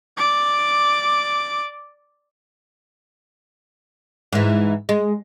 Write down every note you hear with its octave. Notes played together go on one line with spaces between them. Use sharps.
D5 D6
G#2 E3
G#3